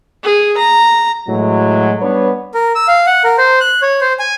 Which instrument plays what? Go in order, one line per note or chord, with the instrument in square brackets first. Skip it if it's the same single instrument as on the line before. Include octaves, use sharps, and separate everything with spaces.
[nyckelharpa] G#4
A#5
[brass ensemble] A2 E3 F#3 G#3 F#4
G3 B3 D4 B4 C#5
[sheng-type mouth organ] A#4
E6
F5
F#5
A#4
C5
F#6
C#5
C5
G#5